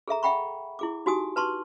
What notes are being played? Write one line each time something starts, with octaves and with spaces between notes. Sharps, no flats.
G#4 A4 E5 A#5
E5 F#5 G5 B5 C#6
E4 G#4 D6
D#4 F#4 G4 G#5 D#6
B4 A5 C6 C#6